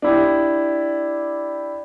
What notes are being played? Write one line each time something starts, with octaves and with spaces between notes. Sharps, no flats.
D4 E4 G4